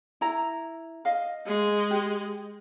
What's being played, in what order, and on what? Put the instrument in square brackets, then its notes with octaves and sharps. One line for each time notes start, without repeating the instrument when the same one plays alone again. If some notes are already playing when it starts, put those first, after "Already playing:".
[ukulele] E4 A#5
D#5 F5
[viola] G#3
[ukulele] G4